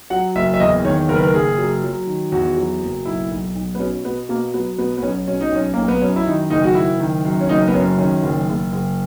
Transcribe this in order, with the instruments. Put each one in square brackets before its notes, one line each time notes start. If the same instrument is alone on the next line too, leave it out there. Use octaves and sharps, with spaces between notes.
[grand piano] F#3 F#5
F#1 E5
E5
E2 D#5
D#3 C#5
F#1 A#4
B4
A#4
F#1 G#4
F#3
F#3
D#3
E2 F#4
F#3
F#1
B1 E4
B1
B1
B3
B2 C#4
B2 B3
B2 A#3
F#3 B3
B2 B3
B3
B1 C#4
B2 C#4
D#4
B1 C#4
B1 A#3
B3
F#2 C#4
E4
D#3 D#4
F#1 D#4
F#4
F#1 E4
D#3
F#2
C#4
F#1 D#4
B3
F#2 C#4
D#3 C#4
F#1
F#1
F#1